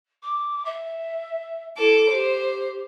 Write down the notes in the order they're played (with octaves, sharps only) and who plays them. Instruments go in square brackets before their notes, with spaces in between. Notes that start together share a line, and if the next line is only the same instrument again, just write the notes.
[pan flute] D6
E5
[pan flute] E4 [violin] A4 D6
[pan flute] G4 [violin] C5